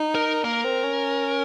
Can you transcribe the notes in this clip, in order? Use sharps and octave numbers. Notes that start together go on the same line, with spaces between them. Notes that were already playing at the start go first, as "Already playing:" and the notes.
Already playing: D#4
A#4
A#3 A#4
C4
C#4